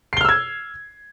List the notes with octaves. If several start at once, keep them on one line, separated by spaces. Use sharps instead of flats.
E6 F6 G#6 C7 G7